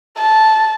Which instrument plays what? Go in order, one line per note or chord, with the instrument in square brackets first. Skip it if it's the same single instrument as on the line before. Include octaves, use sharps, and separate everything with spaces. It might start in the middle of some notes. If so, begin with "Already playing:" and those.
[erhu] A5